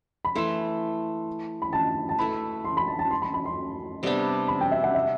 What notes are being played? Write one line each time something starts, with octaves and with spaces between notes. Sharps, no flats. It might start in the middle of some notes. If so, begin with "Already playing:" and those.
B5
E3 A3 E4 A4 C6
B5
A5
A5
A3 E4 B4 B5
C6
B5
A5
A5
C6
B5
B5
C6
C3 G3 B3 D4
B5
G5
E5
F#5
E5